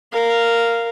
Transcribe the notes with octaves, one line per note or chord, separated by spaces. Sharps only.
A#4 F5